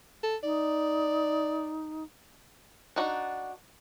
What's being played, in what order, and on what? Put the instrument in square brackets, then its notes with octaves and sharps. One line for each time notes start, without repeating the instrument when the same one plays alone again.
[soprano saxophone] A4
[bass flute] D#4 [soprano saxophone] D5
[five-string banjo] D4 D#4 F#4